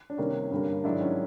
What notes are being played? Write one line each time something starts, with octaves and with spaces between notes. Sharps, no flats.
D4
C3 D#3 G3 A#3 C#4
G2 D3 G3 A#3
G#2 D#3 F#3 D4 E4
C#4 D#4